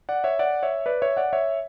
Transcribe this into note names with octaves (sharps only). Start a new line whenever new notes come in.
D5 F#5
C#5 E5
D5 F#5
C#5 E5
B4 D5
C#5 E5
D5 F#5
C#5 E5